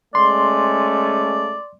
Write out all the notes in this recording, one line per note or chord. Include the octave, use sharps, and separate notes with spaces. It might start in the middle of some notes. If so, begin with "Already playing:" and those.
G#3 A3 C#4 D5 C6